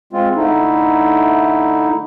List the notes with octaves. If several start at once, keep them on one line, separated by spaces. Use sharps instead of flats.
G#3 C4 F4
D3 A3 D#4 E4